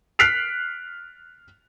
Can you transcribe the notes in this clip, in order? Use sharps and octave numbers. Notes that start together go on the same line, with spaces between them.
F6 F#6 B6 C7 D7 F7